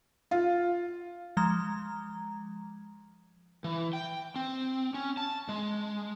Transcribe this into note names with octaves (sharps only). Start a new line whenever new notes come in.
F4
F3 G#3 A#5
E3
G5
C4
C#4
A5
G#3